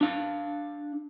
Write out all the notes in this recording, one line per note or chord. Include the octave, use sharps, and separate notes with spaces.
D4 F5